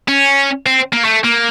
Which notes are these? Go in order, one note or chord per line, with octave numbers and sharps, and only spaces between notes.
C#4
C4
A#3
A3
A#3